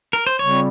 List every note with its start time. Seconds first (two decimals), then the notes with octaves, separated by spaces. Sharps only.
0.13 A#4
0.27 C5
0.39 C#3 G3 C4 F4 C#5